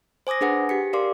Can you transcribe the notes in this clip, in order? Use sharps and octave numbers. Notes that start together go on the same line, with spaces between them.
C5 G#5 D6 D#6 A#6
D4 G#4 B4 F#5 G#5
G4 B6 C#7
G4 A#4 D5 F5 C6 D6